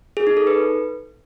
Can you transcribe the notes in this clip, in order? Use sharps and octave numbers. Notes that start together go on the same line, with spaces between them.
G#4
D#4
A4
B4